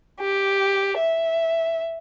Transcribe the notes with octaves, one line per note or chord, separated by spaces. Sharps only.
G4
E5